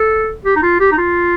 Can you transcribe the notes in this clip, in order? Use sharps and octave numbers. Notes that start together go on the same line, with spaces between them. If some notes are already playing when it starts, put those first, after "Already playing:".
Already playing: A4
G4
D#4
F4
G4
D#4
F4